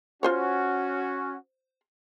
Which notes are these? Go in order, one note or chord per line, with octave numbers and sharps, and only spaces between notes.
C#4 F4 F#4 C5 C#5